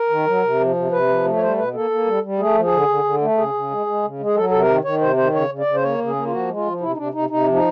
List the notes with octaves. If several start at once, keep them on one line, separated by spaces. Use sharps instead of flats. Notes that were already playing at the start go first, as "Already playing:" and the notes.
Already playing: A#4
D#3
F#3
C3
F3
C3
C3 B4
F3
A3
C#5
G3 C5
B2 B4
A#3 A4
A#3
G3
G3
A3 G#4
F3
G#4
D3
D3
D3
A3
C#3 G#4
C#3
G#3
G#3
C#3
G#3
G#4
F#3 A4
C3 A4
A#4
D#3
D#3 C#5
C3 C5
D#3 C5
C#3 C#5
C#3
D5
C#3
C5
A#3 C#5
C#3
G#4
A#3
F4
F3 F#4
G#3
F4
F3
C3 E4
D#4
C3 D4
C3 D#4
C3 D#4
F3
D#4